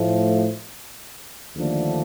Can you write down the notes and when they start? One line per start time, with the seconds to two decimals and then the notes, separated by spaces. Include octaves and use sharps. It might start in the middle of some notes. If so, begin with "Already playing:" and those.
Already playing: A2 F3 A3
1.56 D#2 D3 F3 A3 D4